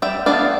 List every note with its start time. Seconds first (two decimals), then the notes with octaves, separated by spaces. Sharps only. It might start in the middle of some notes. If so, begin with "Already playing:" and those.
0.02 G3 E5 G5
0.26 B3 D4 D5 F5